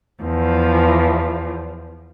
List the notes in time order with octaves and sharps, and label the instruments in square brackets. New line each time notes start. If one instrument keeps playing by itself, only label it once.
[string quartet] E2 F3